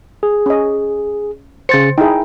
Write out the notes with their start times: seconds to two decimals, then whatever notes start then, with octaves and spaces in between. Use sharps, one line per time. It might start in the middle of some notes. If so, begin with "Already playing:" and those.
0.23 G#4
0.46 C#4 D#5
1.69 C#3 C5 A6 C#7
1.98 D#4 E4 G#4 G5